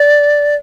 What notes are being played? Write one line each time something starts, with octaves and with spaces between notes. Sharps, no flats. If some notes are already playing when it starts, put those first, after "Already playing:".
Already playing: D5